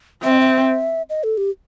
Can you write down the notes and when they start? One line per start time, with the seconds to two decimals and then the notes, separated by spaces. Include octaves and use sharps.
0.23 C4 E5
0.32 D#5
0.40 E5
1.10 D#5
1.24 A4
1.37 G4